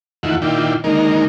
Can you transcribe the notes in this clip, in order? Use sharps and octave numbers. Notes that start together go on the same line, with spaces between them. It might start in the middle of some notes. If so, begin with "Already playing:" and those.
E2 D#3 A3 E4 F4 F#5
A#2 D#3 D4 E4 F4 G5
D3 D#3 G#3 A#3 D#4 A#4